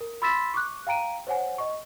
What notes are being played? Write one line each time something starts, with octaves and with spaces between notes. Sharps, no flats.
A#4
B5 C6 E6 A6 B6 E7
C#6 D6 F#6
F5 G5 A#5 D7 D#7
C5 C#5 F#5 G#5
D#5 C#6